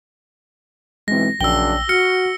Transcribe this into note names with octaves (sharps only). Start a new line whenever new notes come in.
B1 E3 G#3 C4 A#6
A#1 F#2 C#3 D4 G5 E6 G7
F#4 F6 C#7